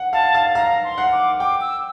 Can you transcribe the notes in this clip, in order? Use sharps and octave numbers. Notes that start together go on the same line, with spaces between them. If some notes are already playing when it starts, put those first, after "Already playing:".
Already playing: F#5
F5 A5
F5
F5 A#5
C6
F#5
D6
G5 D6
E6